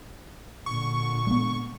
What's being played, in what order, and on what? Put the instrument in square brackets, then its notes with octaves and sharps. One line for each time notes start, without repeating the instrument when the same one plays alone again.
[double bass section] A#2 D3 [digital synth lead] C#6
[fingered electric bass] G#3 A3 B3